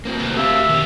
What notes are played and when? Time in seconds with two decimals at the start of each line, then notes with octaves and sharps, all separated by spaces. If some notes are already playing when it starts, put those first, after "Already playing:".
0.05 A#3 C4 F#4
0.20 D2
0.37 G4 E5 F5
0.69 B2 D#3 C#4